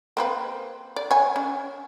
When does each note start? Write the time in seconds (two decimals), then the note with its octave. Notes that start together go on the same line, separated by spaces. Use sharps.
0.17 A#3 C4 B4
0.96 D5
1.11 C#5 G#5
1.36 C#4